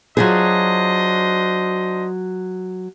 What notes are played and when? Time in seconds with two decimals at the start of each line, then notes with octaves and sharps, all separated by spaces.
0.17 F#3 D4 F4 G#4 C5 D#5